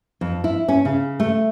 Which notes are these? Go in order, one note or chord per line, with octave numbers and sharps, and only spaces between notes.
F2
E4
C#4
C#3
A3